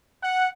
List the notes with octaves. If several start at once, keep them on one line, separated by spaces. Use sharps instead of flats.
F#5